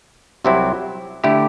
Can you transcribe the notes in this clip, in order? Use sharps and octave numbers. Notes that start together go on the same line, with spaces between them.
C2 C3 F#3 C4 E4
D3 A3 E4 G4